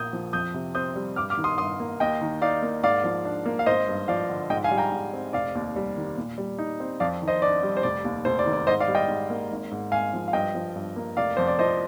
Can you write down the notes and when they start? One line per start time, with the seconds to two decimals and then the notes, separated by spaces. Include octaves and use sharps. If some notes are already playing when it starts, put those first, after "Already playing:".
Already playing: A#1 A#2 A#3 D#6 G6
0.13 F3
0.33 F2 D#6 G6
0.54 C3
0.75 C4 D#6 G6
0.96 G3
1.16 G2 D6 F6
1.30 D6 F6
1.37 D#3
1.44 C6 D#6
1.58 G2 C6 D#6
1.80 A#3
2.00 D#2 D#5 G5
2.21 D#3
2.42 D#4 D5 F5
2.62 A#3
2.83 G#2 D5 F5
3.04 F3
3.25 D4
3.46 A#3
3.59 F5
3.66 G#1 C5 D#5
3.88 G2
4.08 F3 D5 F5
4.29 D3
4.50 G#2 D#5 G5
4.64 F5 G#5
4.71 G3
4.78 G5 A#5
4.92 G#2
5.13 C4
5.33 F1 D5 F5
5.55 D#2
5.76 G3
5.96 D#3
6.17 A#2
6.38 G3
6.59 D#4
6.80 C4
7.00 F2 D5 F5
7.22 D#3
7.28 C5 D#5
7.42 D4 D5
7.63 G3
7.77 C5
7.83 F1 D5
8.04 D#2
8.25 F1 C5
8.39 D5
8.46 D#3
8.53 D5
8.67 G#2 C5 D#5
8.80 D5 F5
8.88 G3
8.95 D#5 G5
9.08 G#2
9.30 A#3
9.51 G#1
9.71 G#2
9.92 G#1 F5 G#5
10.14 F3
10.28 F5
10.33 G2 D#5 G5
10.55 F3
10.76 G2
10.96 A#3
11.17 F1 D5 F5
11.37 F2 C5
11.48 D5
11.59 F3 C5 D#5